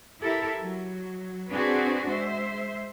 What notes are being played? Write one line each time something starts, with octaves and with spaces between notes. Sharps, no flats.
E4 G4 A4 A#4 E5
F#3
C4 D4 F#4 G#4 B4
G#3 C5 E5